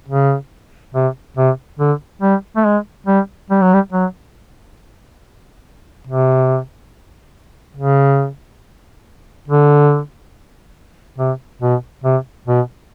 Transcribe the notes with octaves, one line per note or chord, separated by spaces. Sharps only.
C#3
C3
C3
D3
G3
A3
G#3
G3
G3
F#3
G3
F#3
C3
C#3
D3
C3
B2
C3
B2